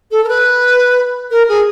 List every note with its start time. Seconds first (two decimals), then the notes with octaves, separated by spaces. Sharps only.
0.11 A4
0.24 A#4
0.28 B4
1.31 A#4
1.49 G#4